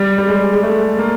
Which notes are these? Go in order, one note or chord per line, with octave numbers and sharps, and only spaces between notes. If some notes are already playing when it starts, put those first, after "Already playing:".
Already playing: G3
G3
G#3
G#3
A3
A#3